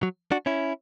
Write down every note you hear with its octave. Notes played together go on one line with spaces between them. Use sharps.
F#3
D4 F#4
C#4 E4